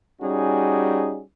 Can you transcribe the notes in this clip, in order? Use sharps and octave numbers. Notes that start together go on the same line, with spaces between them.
G3 C#4 D#4 F#4 G#4